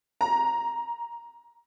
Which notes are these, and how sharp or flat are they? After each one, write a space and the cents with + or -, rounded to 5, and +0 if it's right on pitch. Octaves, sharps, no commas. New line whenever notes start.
A#5 +10